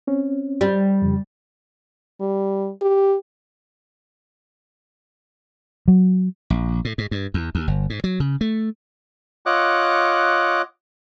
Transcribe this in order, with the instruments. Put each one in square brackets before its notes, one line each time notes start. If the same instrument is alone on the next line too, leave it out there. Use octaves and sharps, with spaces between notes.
[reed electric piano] C4 C#4
[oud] G3
[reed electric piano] F2 C#3
[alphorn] G3
G4
[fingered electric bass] F#3
[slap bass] A#1
A2
G#2
G2
E2
D#2
G1
G#2
F#3
C#3
A3
[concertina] F4 C#5 D#5 F#5 D6 F#6